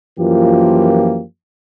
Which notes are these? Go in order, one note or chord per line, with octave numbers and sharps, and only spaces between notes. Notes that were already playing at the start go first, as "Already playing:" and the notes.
F#2 E3 F3 A#3 F4 G4